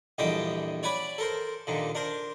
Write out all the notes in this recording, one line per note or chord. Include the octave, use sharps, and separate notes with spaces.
A#1 E2 D3 G3 D#5 G5
C#5 D5 F#5 G#5 B5 D6
A4 A#4 C5
D#2 A#2 D3
D4 A#4 C5